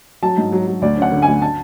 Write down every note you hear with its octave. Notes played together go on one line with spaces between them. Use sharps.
F#3 A5
G#2
F#3
F#3
D2 D5
C#4 F#5
D3
D2 G#5
A5